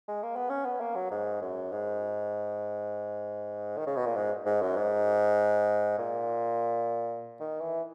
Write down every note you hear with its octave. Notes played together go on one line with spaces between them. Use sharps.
G#3
A#3
B3
C#4
B3
A#3
F#3
G#2
F#2
G#2
D#3
C#3
B2
A#2
G#2
G#2
F#2
G#2
A#2
D#3
E3